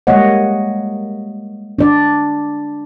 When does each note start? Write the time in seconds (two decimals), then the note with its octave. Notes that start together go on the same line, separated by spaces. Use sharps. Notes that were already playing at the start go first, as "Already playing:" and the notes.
0.07 G3 G#3 A#3 C#5 D#5 F#5
1.79 D4 D5